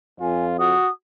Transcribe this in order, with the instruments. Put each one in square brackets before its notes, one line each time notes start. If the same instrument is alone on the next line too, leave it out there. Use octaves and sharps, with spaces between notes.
[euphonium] F2 [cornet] F4 [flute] G#5
[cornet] F#4 [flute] D#6